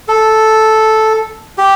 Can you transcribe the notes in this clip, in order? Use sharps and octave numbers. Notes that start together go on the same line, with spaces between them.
A4
G4